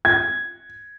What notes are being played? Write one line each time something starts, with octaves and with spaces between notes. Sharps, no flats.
G#6